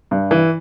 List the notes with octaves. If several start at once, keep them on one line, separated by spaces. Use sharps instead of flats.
G2
E3